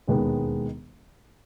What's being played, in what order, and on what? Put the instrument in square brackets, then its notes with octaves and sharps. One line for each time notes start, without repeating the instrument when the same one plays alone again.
[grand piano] E1 D#2 D#3 G#3 B3